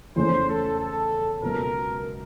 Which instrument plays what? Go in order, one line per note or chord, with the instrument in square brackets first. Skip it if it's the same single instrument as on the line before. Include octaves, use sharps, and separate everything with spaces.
[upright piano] E2 C#3 E3 A3 C#4 [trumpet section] C5
[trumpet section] A4
A4
[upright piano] C#2 B2 F#3 B3 [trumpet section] A#4